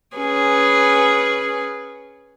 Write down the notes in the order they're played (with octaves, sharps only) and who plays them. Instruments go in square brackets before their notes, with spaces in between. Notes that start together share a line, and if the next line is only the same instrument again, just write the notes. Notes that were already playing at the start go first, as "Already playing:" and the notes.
[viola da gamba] C#4 G#4 B4